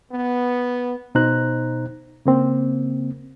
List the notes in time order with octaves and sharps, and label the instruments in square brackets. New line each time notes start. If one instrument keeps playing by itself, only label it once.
[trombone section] B3
[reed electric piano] B2 D#4 C5 A#5 F#6
C#3 A#3 C4